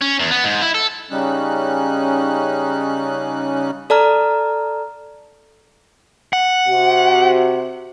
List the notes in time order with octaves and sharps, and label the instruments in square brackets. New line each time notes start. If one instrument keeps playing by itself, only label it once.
[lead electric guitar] C#4
E2
B3
G#2
E4
A4
[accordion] C#3 G3 C#4 D#4 F#6
[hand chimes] A4 D5 A5 A#5 F6
[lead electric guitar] F#5
[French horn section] C3 F#4